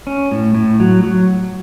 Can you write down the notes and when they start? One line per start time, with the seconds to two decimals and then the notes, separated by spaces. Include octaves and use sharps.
0.07 C#4
0.31 A2
0.55 A2
0.80 F#3
1.03 F#3